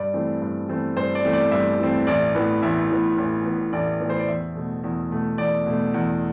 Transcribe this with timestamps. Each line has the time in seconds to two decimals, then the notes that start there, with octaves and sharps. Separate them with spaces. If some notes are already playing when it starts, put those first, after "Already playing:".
Already playing: G2 D5
0.14 E3 A3 C4
0.41 G2
0.69 E3 A3 C4
0.97 G2 C5
1.15 D5
1.24 E3 A3 C4
1.33 D5
1.52 G2 E5
1.79 E3 A3 C4
2.07 A1 D5
2.35 A2 E3 B3
2.62 A1 E5
2.90 A2 E3 B3
3.18 A1
3.45 A2 E3 B3
3.73 A1 D5
4.00 A2 E3 B3
4.09 C5
4.19 D5
4.28 E2 E5
4.55 B2 A3
4.84 E2
5.11 B2 A3
5.38 E2 D5
5.66 B2 A3
5.94 E2